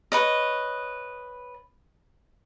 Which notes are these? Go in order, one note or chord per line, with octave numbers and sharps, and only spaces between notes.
B4 C#5 D#5